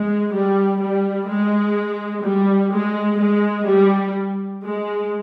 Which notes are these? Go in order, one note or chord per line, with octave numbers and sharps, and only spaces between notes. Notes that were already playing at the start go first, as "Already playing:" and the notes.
Already playing: G#3
G3
G3
G#3
G3
G#3
G#3
G3
G#3